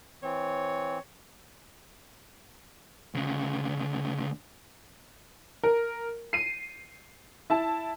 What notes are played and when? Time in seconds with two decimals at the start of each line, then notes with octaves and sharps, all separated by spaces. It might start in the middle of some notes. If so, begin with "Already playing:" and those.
0.23 E3 C4 C#5
3.14 D2 C#3
5.63 A#4
6.33 C7 D#7
7.50 E4 A5